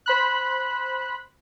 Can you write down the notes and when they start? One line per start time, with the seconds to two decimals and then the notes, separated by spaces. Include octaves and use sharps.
0.06 C5 B5 F#6